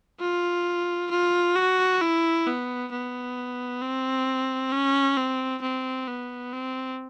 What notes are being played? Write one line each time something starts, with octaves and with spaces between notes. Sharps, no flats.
F4
F4
F#4
E4
B3
B3
C4
C#4
C4
C4
B3
C4